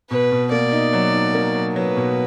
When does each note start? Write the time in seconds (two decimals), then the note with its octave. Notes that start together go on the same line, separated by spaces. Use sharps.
0.10 B2 B4
0.32 B2
0.51 A#3 D5
0.72 D#4
0.93 F#3
1.13 D#4
1.34 A#3
1.54 F#3
1.75 F#3 B4
1.96 B2